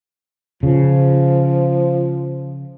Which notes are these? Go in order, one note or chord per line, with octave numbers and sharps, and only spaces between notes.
C#3 F3